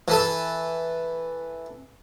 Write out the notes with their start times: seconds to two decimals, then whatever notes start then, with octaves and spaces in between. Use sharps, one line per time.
0.08 E3 A4